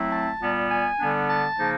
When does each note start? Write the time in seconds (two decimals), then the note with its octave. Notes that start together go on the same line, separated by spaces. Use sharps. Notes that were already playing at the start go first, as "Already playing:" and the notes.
Already playing: F#3 A3 C4 E4
0.12 A5
0.41 A#2 G3 B3
0.71 G#5
0.99 D3 G3 B3 D4
1.29 A5
1.58 C#3 F3 A#3 D#4